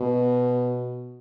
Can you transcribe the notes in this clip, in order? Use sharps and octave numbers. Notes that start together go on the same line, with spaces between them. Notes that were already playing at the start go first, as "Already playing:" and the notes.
Already playing: B2